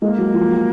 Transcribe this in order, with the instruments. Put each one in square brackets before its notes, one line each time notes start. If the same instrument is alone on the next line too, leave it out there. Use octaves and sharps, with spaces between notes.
[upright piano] G#3 [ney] A#3
[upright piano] F#3
F3
F#3